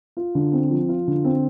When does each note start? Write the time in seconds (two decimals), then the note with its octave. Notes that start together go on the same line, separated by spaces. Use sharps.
0.17 F4
0.35 D3
0.52 C4
0.70 F3
0.89 F4
1.08 D3
1.24 C4